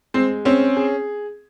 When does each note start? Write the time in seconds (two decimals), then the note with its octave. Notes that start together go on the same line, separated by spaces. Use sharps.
0.14 G#3 C4
0.45 C4 C#4
0.77 G#4